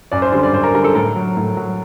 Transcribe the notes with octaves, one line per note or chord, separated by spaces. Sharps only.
F#2 D5
C5
D3 G3 C5
D5
F#2 C5
A#4
D3 G3 A#4
A4
A2 A#4
F#3
A2
F#3